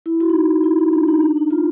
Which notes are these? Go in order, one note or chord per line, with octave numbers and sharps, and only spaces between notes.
E4
E4 F#4
D#4
E4
E4
E4
D#4
D4
D#4
D4
D#4
F4